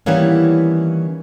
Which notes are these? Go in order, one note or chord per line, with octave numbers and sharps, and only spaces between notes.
D#3 E3 G3 A#3 B3 C#4